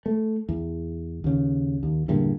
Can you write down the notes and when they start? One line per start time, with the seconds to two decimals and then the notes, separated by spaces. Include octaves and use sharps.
0.06 A3
0.49 E2
1.24 D#2 C#3
1.83 D#2
2.08 E2 G2 A#2 D3